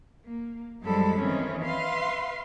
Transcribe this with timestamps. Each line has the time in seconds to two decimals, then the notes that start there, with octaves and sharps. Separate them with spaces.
0.25 A#3
0.82 F#2 F3 G3 G#3 A4 B5
1.19 D#3 E3 C4 C#4
1.64 B4 E5 F5 C6